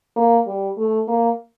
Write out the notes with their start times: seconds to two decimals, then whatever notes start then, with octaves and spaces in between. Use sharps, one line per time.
0.16 A#3
0.47 G3
0.77 A3
1.08 A#3